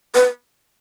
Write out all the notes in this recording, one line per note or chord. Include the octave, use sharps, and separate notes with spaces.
B4